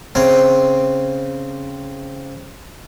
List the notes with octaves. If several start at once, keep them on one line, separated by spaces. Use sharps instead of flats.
C#3 C4